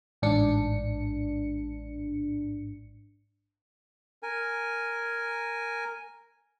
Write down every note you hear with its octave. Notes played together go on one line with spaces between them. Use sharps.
A1 G#2 D4 C#7
A#4 G#5